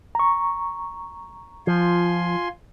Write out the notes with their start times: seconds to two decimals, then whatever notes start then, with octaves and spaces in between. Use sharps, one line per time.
0.15 A#5 C#6
1.67 F3 F4 G#5 C6